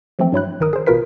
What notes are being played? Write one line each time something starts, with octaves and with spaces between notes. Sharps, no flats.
E3 F3 A3 C4
G2 F#3 E4 F#6
G1 D#3 A#4 D#6
G#4 C5
A1 B2 F4 A#4 B4 B6